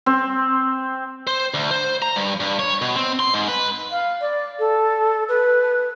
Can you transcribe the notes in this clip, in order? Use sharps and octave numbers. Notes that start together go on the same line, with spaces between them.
C4
C5
D2
C5
A#5
G2
G2
C#5
B2
C4
C6
G#2
B4
F5
D5
A4
B4